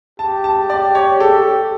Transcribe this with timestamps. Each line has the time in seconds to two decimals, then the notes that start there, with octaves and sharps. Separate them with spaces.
0.19 G4 A5
0.44 A5
0.70 D5
0.95 C#5
1.20 A4